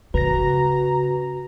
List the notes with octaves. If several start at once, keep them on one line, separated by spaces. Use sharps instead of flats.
C#3 F#4 B4 A#5 A#6